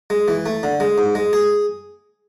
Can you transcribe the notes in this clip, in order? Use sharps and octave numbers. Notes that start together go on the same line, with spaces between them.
G#3
E3
A3
D3
G#3
G#2
G#3
G#4